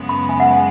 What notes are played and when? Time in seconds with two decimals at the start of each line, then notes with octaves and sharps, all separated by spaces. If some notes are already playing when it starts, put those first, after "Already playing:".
Already playing: F#2 C#3 G#3 B3
0.09 B5
0.29 G#5
0.40 F#5
0.51 G#5